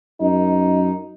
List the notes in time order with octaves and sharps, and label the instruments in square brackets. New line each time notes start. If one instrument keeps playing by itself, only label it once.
[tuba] F#2 [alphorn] D#4